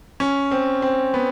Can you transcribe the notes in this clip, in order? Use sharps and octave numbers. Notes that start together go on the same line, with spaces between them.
C#4
C4
C4
B3